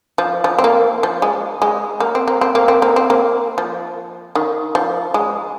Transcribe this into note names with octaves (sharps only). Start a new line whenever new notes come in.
F3
F3
C4
A#3
F3
G#3
G#3
A#3
C4
A#3
C4
A#3
C4
A#3
C4
A#3
F3
D#3
F3
G#3